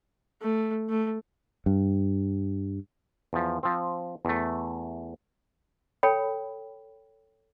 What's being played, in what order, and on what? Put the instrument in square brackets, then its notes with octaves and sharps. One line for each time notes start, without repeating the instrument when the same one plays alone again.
[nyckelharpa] A3
A3
[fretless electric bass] G2
[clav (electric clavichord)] E2 F3
F3 C4
E2 A3
[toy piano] A4 C#5 G5 B5